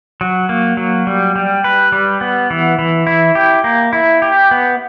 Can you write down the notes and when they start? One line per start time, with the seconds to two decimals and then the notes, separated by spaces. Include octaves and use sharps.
0.21 F#3
0.49 A#3
0.77 F#3
1.07 G3
1.36 G3
1.64 B4
1.92 G3
2.21 B3
2.50 E3
2.79 E3
3.07 E4
3.35 G4
3.64 A#3
3.93 E4
4.22 G4
4.51 B3